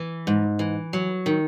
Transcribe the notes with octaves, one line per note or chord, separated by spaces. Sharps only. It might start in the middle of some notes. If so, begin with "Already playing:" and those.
Already playing: E3
G#2
E3
F#3
D#3